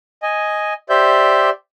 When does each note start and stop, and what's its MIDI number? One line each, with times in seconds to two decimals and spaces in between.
0.23 0.74 75
0.23 0.74 80
0.89 1.50 67
0.89 1.50 72
0.89 1.50 74
0.89 1.50 76
0.89 1.50 91